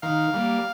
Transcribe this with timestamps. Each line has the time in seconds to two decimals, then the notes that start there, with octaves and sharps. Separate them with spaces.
0.02 D#3 F5
0.34 G3 A#3